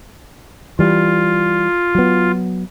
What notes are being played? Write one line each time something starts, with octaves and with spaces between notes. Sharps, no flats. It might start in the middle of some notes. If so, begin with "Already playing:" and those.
E3 G3 F4
F#3 B3